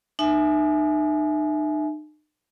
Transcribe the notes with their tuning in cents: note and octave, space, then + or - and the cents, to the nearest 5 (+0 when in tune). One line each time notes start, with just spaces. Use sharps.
D#4 -40 E5 +0 G#5 +25